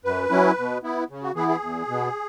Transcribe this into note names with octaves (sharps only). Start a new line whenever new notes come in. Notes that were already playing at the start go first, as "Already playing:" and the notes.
F#2 B4
F#3 C#4 E4
B2
B3 E4
C#3
F#4
E3 B3 E4 G#4
G#4
E2
B2 B3